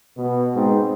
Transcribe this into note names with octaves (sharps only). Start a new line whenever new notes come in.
B2
G#2 C4